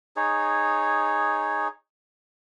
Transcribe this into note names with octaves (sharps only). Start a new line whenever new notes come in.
D#4 G#4 C#5